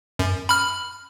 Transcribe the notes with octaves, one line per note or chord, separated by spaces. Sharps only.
F#2
B5 F6